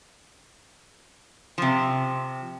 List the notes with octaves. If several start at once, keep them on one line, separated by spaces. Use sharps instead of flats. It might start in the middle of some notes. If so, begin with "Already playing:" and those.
C3 F3